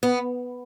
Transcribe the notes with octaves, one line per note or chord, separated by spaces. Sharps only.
B3